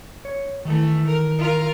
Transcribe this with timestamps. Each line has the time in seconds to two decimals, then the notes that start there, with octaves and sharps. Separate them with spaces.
0.25 C#5
0.65 D#3 E3 A3
1.07 A#4
1.38 F4 A#4